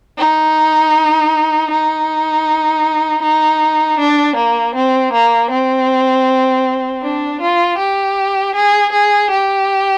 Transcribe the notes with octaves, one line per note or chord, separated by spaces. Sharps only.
D#4
D#4
D#4
D4
A#3
C4
A#3
C4
D4
F4
G4
G#4
G#4
G4